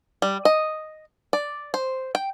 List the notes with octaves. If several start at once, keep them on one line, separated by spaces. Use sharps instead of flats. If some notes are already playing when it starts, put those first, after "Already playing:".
G3
D#5
D5
C5
G5